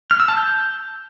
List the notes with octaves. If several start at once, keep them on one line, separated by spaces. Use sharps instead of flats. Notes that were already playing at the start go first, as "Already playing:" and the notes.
F6
E6
A5
G6